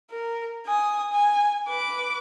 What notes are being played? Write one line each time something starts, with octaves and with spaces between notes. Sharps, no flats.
A#4
G#5 D#6
G#5
B4 D6